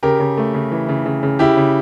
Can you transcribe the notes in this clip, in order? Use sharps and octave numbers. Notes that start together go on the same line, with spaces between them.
C#3 G4 A#4
C#3
A3
C#3
E3
C#3
C#3
C#3
C#3 E4 G4
C#3